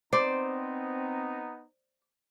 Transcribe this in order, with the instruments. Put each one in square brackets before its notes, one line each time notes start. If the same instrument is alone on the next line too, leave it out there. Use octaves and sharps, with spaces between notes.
[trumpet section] B3 D#4 A#5 [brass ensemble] C4 [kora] C5 [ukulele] D5